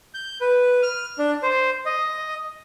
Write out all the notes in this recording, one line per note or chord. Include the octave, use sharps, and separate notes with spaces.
G6
B4
F6
D4
C5
D#5